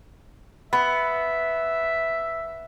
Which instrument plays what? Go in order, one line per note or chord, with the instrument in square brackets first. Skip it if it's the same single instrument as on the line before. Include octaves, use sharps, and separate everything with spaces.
[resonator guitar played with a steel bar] B3 [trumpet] E5 [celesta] B5